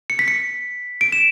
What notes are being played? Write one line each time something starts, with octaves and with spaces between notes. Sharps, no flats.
C#7
B6
C#7
D7
E7